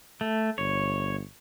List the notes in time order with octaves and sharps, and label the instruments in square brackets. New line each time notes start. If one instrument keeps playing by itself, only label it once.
[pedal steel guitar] A3
[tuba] G1 [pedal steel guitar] C#5